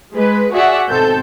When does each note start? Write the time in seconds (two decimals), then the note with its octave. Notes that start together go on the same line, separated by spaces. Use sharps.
0.14 G#3 B4
0.53 F#4 G#4 D5 E5 F#5
0.88 G#1 B2 C4 A4 G6